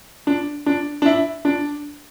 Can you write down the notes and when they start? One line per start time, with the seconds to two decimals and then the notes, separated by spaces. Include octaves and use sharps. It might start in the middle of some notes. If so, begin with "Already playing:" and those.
0.27 D4
0.66 D4
1.02 D4
1.06 E4
1.45 D4